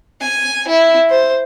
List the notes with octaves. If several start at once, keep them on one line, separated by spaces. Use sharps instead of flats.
G#5
E4
C5